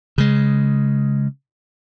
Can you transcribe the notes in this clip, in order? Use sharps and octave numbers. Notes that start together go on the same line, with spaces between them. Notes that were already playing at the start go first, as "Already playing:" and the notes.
C#3 G#3